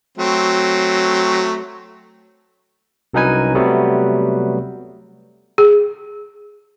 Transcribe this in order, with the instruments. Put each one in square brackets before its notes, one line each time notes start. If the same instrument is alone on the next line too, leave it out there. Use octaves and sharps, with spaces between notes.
[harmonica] F#3 A3 C4
[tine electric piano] C2 F#3 C#4 D#4 B4 G#5
C3 F#3 G3 A3 B3
[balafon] G#4